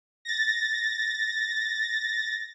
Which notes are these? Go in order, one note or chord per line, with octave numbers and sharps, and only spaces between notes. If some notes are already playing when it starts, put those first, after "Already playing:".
A6 A#6